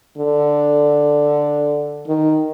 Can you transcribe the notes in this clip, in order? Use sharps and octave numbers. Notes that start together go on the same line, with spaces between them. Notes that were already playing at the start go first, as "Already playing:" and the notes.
D3
D#3